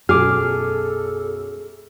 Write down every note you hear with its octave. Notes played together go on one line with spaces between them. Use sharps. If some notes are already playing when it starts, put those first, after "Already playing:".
B1 F#2 G#4 A4 D6 F6